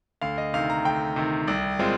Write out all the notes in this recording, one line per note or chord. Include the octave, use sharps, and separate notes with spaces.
D2 F5
D#5
C3 D#3 F5
A#5
D2 G5
C3 D#3
C2
A#2 G#3 C4 F4